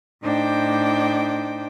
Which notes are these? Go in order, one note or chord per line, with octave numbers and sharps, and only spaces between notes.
A2 D4 D#4 C5 G5 D6